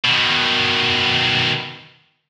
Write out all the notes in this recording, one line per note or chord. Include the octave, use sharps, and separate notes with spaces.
B2 D#3